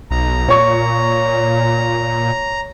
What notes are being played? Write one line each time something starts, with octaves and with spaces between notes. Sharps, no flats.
B1 A#5
A#2 C#5 C#6